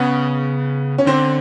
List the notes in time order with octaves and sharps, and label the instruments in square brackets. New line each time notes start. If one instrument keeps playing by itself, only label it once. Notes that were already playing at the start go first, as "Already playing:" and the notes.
Already playing: [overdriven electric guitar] C#3 [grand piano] B3
[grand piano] C#4
[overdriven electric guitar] D3 [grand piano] C4